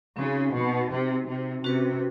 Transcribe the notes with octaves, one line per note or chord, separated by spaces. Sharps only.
C#3 C4 D#4 F#4
B2
C3
C3
C3 C#4 F#4 B4